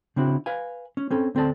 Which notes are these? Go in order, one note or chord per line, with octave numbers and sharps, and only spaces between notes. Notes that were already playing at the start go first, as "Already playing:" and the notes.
C#3 C4 D4 E4 F#4
B4 F5 G#5
C#4
C4 C#4 A4
D2 C4 A4 D5 A5